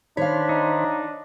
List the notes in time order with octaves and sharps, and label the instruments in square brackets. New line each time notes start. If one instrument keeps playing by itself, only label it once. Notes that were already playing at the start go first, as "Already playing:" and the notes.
[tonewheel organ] D#3 C5 B5 [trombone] D4 [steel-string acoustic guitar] C#5 F5
[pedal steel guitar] D#4